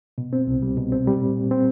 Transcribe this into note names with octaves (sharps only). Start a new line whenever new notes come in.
B2
C4
C2
G3
B2
C4
G3
A#2
A#2
C4